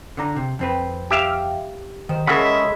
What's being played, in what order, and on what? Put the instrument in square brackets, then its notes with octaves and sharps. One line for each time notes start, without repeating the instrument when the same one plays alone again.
[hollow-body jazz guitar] D3 D4 A#5
C3
F2 C4 B4
[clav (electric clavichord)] G4 E5 F5
[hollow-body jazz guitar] D#3 C5
[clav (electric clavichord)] C#3 [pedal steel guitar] G#3 A4 B5 [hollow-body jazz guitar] A#4 D#5 F#5 [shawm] E5